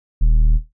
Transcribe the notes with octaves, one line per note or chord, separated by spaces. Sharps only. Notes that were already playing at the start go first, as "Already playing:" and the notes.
D#1